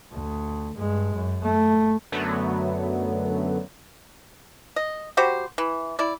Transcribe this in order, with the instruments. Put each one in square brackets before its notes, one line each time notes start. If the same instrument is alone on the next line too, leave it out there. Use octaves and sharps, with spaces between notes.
[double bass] D2
G2 G#3
F#2
A3
[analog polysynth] F#2 D3 F#3 A3 B3
[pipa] D#5
G3 F#4 G4 C5
E3
E4 D5